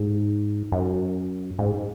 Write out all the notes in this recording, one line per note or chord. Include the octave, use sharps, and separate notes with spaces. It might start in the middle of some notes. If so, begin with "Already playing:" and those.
Already playing: G#2
F#2
G#2